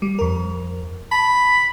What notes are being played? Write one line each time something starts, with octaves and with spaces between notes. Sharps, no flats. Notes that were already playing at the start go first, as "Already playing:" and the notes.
G3
F2 A#4
A5 B5